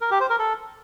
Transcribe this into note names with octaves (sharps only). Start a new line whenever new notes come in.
A#4
G4
C5
A#4
A4